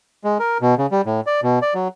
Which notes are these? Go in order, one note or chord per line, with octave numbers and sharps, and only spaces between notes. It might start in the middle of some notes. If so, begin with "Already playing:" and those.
G#3
A#4
B2
C#3
G3
A2
D5
B2
D5
F#3